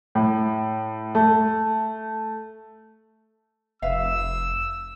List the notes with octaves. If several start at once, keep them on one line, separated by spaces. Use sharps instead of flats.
A2
A3
F1 B4 E5 F5 E6